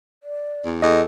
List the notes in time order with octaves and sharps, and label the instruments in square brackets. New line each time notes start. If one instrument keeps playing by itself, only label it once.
[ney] D5
[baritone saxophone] E2
[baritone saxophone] E2 [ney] A4 [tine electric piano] D#5